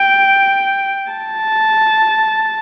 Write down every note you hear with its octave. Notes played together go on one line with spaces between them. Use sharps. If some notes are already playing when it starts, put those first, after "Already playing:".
Already playing: G5
A5